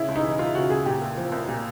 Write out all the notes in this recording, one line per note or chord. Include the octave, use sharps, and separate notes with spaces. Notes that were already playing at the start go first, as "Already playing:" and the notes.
Already playing: C#3 E4
C#2
D#4
E3
C#2 F4
C#3 F#4
C#2 G#4
A#2 G4
C2
F3
C2
A#2